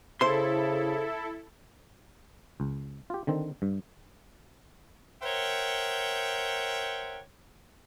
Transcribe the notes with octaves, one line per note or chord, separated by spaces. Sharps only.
C#3 E4 A4 C5 C6
C#2
F4 G4
D3 D#3 C4
G2
A#4 C5 C#5 E5 F#5 G5